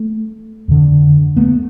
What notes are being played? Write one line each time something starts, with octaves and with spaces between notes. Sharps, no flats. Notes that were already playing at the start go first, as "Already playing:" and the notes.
Already playing: A3
F2 D3
A3 B3